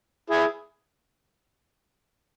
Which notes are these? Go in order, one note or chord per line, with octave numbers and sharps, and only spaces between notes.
E4 G#4